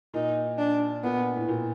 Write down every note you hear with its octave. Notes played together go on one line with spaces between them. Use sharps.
A#2 D#4
D4
A#2 B3
A2
A#2